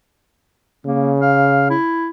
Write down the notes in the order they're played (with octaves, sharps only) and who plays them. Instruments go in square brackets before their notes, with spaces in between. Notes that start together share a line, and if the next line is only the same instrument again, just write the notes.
[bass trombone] C#3 [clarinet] A#3
[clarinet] F5
E4